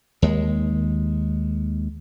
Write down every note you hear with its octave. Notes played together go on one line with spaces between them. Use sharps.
D#2 G#3